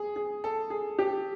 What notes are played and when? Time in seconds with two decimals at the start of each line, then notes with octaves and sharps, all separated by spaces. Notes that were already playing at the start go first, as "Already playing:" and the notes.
Already playing: G#4
0.16 G#4
0.44 A4
0.70 G#4
0.99 G4